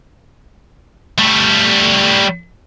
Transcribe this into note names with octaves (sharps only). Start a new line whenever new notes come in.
G3 A3